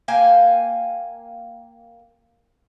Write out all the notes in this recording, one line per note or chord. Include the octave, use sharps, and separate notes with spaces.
A#3 F5 G5 G#5